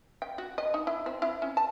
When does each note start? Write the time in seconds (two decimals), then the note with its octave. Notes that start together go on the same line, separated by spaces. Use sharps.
0.22 G5
0.38 F#4
0.58 D#5
0.74 D#4
0.87 E4
1.06 C4
1.22 E4
1.42 C#4
1.57 A5